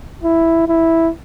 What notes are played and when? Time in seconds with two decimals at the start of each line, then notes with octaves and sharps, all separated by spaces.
0.23 E4
0.68 E4